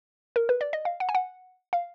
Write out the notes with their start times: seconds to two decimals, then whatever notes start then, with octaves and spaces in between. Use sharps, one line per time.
0.36 A#4
0.49 B4
0.61 D5
0.73 D#5
0.85 F5
1.00 F#5
1.09 G#5
1.15 F#5
1.73 F5